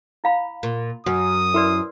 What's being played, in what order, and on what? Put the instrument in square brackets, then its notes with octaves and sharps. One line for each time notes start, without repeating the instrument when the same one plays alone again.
[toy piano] E4 F5 B5
[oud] A#2
[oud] F#2 [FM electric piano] F#4 [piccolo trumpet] D#6
[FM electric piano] E4 C6 [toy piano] A#4 B4 D5